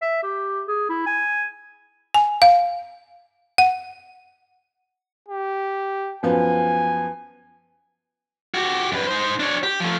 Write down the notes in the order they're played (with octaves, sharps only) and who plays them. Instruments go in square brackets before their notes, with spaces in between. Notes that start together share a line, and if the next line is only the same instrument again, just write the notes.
[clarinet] E5
G4
G#4
E4
G#5
[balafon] G#5
F5
F#5
[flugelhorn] G4
[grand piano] F#2 F3 B3 [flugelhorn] G#5
[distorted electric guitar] F#4 G4
F#2 B4
D#4 C5
D4 C#5
G4
F3 A3